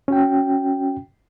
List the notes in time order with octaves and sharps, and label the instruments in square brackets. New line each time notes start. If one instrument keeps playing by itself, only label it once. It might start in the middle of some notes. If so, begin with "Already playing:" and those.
[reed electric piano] C#4 F#4 G5